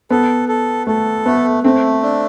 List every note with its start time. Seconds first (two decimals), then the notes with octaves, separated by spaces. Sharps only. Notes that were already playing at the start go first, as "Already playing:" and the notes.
0.10 B3 A4
0.49 A4
0.87 A3 A4
1.26 A3 B3
1.64 A3 C4
2.03 D4